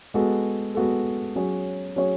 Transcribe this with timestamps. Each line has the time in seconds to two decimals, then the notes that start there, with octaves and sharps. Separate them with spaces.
0.14 G#3 B3 F#4 A4
0.75 G#3 B3 F#4 A4
1.36 F#3 C#4 G#4 C#5
1.96 F#3 C#4 G#4 C#5